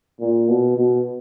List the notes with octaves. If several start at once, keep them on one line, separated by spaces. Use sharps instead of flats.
A#2
B2
B2